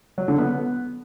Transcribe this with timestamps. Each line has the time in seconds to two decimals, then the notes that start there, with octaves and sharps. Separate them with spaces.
0.18 F#3
0.28 D3
0.38 B3